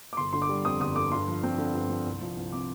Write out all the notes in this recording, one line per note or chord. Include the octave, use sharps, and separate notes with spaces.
D6
G1 C6
D3 C6
D6
G3
F2 D#6
G1 D#6
D3 D6
G2 C6
F3
C4
D3
G2
F3
C2
F3
C2
C3 D6